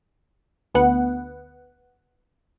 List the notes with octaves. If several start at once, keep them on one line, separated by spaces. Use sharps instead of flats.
D2 B3 F#5